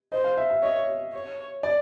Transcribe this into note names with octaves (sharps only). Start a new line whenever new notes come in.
C5 D#5
F5
E5
E5
C#5 D#5
C#5
D5